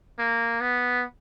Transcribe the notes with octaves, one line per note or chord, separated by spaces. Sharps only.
A#3
B3